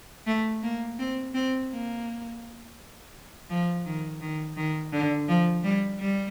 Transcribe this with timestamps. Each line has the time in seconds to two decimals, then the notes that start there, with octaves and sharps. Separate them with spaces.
0.27 A3
0.63 A#3
0.99 C4
1.34 C4
1.70 A#3
3.50 F3
3.86 D#3
4.21 D#3
4.57 D#3
4.93 D3
5.28 F3
5.64 G3
5.99 G3